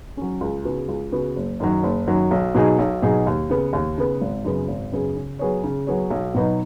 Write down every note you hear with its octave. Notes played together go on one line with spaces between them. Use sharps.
F#3 C#4
C#2
C#3 B3 F#4
C#2
C#3 B3 F#4
F#1
F#2 D#3 F#3
F#1
F#2 D#3 F#3
B1
B2 F#3 D#4 G#4
B1
B2 F#3 D#4 G#4
D#2
C#3 B3
D#2
C#3 B3
G#1
F#2 C#3 B3 G#4
G#1
F#2 C#3 B3 G#4
C#3
F#3 B3 G#4 C#5
C#3
F#3 B3 G#4 C#5
B1
B2 F#3 B3 D#4